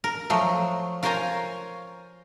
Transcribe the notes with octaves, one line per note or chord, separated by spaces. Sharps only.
A#4
F3 F#3 A3
F4 A#4 C5 C#5 G#5 A#5